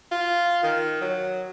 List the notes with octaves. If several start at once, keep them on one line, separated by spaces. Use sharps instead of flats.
F4
D#3
F#3